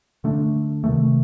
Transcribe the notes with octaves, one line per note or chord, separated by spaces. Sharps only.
D3 A3 D4
C3 D#3 A3